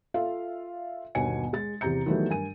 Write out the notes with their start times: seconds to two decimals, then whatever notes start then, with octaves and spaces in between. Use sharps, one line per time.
0.14 F4 A4 E5 F5
1.15 G1 D#2 B2 G#5 C#7
1.53 G#3 A6
1.81 E2 C3 G4 A#5 G6 C#7
2.06 D#3 E3 F#3 G3 A3 B3
2.29 G2 A#4 G#5 D#7